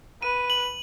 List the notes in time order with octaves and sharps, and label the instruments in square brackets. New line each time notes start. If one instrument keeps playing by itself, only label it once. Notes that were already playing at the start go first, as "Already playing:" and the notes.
[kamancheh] B4 [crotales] D#7
[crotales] F#7